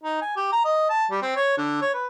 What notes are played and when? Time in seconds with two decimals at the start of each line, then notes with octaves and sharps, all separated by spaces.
0.03 D#4
0.21 G#5
0.36 G4
0.52 A#5
0.65 D#5
0.90 A5
1.10 G3
1.22 C4
1.36 C#5
1.57 D3
1.81 C#5
1.94 B4